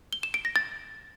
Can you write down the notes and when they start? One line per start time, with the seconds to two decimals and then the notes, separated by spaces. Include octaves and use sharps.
0.13 G7
0.23 E7
0.34 D7
0.45 A#6
0.56 A6